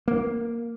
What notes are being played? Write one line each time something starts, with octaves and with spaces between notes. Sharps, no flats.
A#3